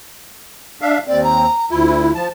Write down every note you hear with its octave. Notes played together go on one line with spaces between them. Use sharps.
D4 E5 F5
D#2 C4 D5
A#5
D2 E4 F4
F3 A5